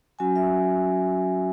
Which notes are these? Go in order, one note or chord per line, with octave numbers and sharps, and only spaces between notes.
F#3 C#4 F#4 G#5
E5